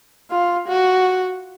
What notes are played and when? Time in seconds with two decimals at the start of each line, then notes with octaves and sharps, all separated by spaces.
0.30 F4
0.68 F#4